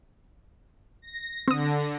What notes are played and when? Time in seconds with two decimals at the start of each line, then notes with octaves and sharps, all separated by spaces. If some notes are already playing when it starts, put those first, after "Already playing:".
1.02 A#6
1.48 D3 C4 D#6